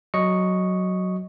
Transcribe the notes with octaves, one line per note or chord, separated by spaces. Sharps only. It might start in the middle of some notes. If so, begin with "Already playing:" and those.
F#3 D#5 C#6 C#7